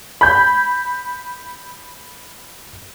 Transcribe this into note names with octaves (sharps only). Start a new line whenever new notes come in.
B5 G6